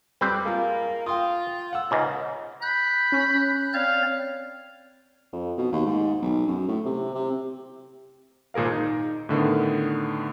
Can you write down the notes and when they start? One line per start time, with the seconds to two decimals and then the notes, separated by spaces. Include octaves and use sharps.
0.21 F2 G3 C4 B4 C5 D6
0.46 G#3 A#3 F4
1.06 F4 G5 C6 D#6
1.73 F#5 E6
1.91 C#2 G#2 C#3
2.62 B5 F#6 G6
3.12 C#4
3.74 C4 C#5 D5 F5
5.33 F2
5.57 B2
5.72 D#2
5.86 G#2
6.22 B1
6.47 F#2
6.68 A2
6.86 C3
7.14 C3
8.54 G#1 A#2 G#4 A#4 F5
8.72 D#4
9.29 A2 D3 D#3 B3